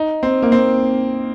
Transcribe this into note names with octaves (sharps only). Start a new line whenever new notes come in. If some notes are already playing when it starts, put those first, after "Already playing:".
Already playing: D#4
C4
A#3
C4